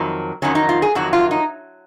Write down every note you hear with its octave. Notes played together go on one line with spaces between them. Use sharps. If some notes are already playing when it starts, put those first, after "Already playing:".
Already playing: F2 D#3 F#3
F2 D#3 F#3 C#4
D#4
F4
G#4
F2 D#3 F#3 F#4
F4
D#4